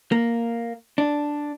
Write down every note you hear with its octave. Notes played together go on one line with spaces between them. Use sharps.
A#3
D4